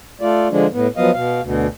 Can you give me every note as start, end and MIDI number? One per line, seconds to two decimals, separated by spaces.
0.21 0.48 57
0.21 0.48 65
0.21 0.48 74
0.51 0.67 50
0.51 0.67 53
0.51 0.67 56
0.51 0.67 62
0.73 0.87 45
0.73 0.87 59
0.97 1.11 53
0.97 1.11 54
0.97 1.11 59
0.97 1.11 75
0.97 1.11 77
1.13 1.41 47
1.13 1.41 77
1.42 1.67 38
1.42 1.67 47